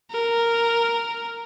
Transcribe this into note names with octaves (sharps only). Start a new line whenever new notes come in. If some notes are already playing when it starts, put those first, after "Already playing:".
A#4